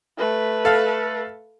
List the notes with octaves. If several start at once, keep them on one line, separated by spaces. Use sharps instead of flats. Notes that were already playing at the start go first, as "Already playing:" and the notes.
A3 B4
A4 F5